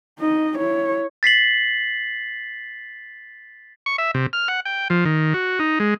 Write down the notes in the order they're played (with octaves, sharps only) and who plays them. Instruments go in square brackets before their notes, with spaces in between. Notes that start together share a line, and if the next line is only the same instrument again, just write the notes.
[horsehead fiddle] D#4 D#5
E4 C#5
[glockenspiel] A6 B6 C7 F#7
[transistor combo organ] C#6
E5
C3
F6
F#5
G5
F3
D#3
F#4
D#4
G#3